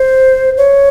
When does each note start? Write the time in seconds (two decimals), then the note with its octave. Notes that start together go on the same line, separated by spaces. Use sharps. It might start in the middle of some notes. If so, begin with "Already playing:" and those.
Already playing: C5
0.57 C#5